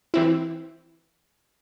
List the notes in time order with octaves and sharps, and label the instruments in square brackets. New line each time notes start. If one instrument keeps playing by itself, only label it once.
[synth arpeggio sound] E3 C4 E4